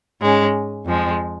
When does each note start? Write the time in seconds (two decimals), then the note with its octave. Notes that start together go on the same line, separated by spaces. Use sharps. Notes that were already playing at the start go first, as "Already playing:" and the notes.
0.21 G#2 G#3 C#4
0.86 F2 F3 G#3